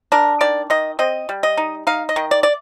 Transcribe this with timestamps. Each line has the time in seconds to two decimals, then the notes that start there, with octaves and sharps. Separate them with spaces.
0.12 D4 A#4
0.41 D#3 D5
0.70 D#3 D#5
0.99 C4 D#5
1.29 G3
1.43 D#5
1.57 D#4
1.87 D#4 F5
2.09 D#5
2.16 D#3
2.31 D5
2.43 D5